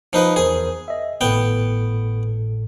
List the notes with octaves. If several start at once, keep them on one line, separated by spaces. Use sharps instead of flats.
F3 D#4 B4
E2 G#4 A#4 C5
D#5 E5
G#1 A2 B3 A4 G5